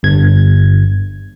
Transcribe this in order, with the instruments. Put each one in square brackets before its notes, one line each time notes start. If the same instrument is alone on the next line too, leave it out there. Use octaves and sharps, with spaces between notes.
[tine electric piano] G1 G2 G#6